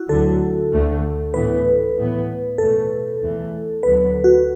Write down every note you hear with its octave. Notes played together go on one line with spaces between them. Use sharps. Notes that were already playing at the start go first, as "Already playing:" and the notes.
Already playing: E4 F#4
D2 D3 F#3 A4
D2 D3 A3
A2 E3 B3 B4
A2 E3 B3
E2 B2 A3 A4
E2 E3 A3
D2 D3 F#3 B3 B4
F#4